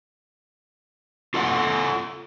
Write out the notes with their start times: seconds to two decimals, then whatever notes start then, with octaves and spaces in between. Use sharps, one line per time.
1.34 F4 A4 D#5 F#5